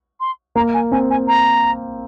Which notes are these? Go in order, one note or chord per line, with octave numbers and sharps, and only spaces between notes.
C6
A#3 A#5
G#5
C4 G#5
G#5
A#5